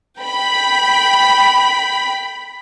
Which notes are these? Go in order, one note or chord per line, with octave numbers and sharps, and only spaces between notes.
G5 B5 B6